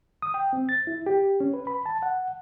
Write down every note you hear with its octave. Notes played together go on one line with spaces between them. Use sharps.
D#6
G5
C4
A6
E4
G4
C#4
B4
B5
A5
F#5